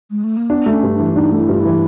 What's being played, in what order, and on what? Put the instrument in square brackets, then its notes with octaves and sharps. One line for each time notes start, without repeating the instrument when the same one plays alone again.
[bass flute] G#3
A3
A#3
[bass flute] B3 [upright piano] D4
[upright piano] A3
[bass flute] C#4
[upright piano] G2
[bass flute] D4
[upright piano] E3
[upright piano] D4 [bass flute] D#4
[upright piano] A3 [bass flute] E4
[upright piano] G2 [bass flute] F4
[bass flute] E4
[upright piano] E3